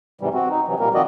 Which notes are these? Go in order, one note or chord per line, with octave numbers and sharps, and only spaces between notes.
G#2 C3 E3 G3
C4 F#4
D#4
C3 E3 F#3
A#2 G3 A#3 A#4
D#3 F3 C4 F#4 D5 D#5